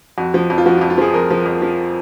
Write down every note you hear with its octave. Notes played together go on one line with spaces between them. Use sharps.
F2 F#4
F3
F2
F4
F3 F#4
F4
F2
F4
F3 G#4
F2 A#4
F3
F2
F3